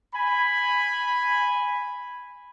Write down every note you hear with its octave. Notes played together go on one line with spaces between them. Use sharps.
G#5 B5